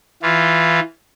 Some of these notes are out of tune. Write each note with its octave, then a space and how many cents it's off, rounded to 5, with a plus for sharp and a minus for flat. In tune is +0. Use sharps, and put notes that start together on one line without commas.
E3 +0 F4 -10